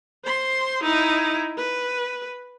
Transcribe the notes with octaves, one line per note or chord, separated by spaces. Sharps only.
C5 C6
D#4 E4
B4